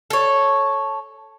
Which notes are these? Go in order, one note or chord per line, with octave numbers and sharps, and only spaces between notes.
A4 C#5